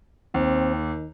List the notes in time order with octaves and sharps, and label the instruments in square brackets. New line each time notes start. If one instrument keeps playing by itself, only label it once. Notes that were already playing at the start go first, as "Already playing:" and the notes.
[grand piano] D#2 [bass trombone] C4
[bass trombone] D#3